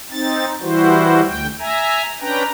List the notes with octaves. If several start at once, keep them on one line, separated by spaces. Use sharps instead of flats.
C4 D#4 A6
E3 G3 E4 F#4 C5
D2 G5
E5 G#5 A#5
C#4 D4 B4 G5 A#5